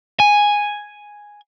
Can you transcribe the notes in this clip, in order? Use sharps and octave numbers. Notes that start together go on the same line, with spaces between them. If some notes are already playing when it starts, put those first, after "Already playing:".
G#5